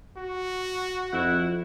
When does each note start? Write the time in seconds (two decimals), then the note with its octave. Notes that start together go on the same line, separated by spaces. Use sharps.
0.17 F#4
1.13 F2 E4 F#5